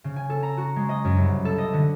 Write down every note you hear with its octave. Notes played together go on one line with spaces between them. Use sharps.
C#3
G#5
A4
A#5
F#4
G#3
D#5
F#2
C2
A4
D#5
D3